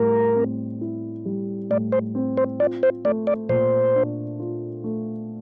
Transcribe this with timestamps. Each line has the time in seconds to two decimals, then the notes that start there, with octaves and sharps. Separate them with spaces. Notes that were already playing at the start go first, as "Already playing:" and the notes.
Already playing: A2 G3 A#4
0.35 C4
0.81 E4
1.25 G3
1.70 A2 D5
1.92 C5
2.15 C4
2.38 C5
2.59 F4 D5
2.83 C5
3.05 A3 D5
3.27 D5
3.49 A#2 C5
3.95 D4
4.40 F4
4.84 A3